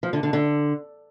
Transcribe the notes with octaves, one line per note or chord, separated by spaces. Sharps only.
F3
D3
D3
D3